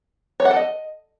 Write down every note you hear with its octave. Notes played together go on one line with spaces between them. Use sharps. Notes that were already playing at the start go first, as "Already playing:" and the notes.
C#5
F#5
A4
D#5